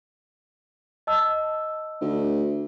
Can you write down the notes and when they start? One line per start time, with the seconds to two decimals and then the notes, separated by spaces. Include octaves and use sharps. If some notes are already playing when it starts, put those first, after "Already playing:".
1.07 D#5 A5 E6
2.01 D2